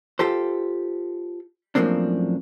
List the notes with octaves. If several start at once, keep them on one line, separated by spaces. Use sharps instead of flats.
F4 G4 A4 C5
F#2 A2 F3 A#3 C4 D4